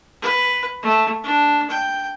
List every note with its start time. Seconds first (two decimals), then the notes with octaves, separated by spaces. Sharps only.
0.22 B4
0.82 A3
1.24 D4
1.70 G5